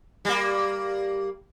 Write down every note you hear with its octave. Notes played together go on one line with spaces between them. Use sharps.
G3 A#3